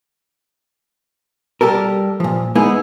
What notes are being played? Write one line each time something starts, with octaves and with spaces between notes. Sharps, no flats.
G3 G4 A4 A#4
A#2 F3
G#3 A#3 B3 D#4 E4 G#4